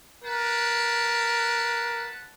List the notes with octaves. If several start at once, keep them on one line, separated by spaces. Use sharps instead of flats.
A#4 B4 F#5 A5